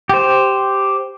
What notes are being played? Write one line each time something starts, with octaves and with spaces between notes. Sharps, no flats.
G4 C5